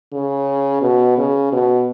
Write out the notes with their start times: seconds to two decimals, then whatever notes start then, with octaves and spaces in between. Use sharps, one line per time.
0.13 C#3
0.82 B2
1.18 C#3
1.52 B2